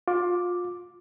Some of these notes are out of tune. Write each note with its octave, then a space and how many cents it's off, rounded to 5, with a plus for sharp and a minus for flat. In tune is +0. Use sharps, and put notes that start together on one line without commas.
F4 +25 D6 +0